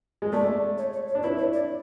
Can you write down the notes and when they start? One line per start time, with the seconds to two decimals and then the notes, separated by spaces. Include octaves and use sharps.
0.22 G#3
0.33 A3 D5
0.78 C#5
0.93 C#5
1.08 C#5
1.15 D4
1.23 E4 B4
1.38 C#5
1.53 D5